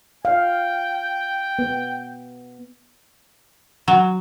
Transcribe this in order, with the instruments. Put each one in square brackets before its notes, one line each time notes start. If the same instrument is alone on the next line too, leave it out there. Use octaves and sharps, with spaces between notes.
[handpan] F5 [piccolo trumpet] G5
[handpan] B3
[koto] F#3